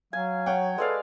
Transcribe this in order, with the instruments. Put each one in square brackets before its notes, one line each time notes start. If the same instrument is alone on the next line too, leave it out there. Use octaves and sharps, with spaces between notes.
[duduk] F#3 [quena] F5 [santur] G#5
[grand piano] C#5 F#5 G5
[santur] G#3 D5 F5 [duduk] A4 [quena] B4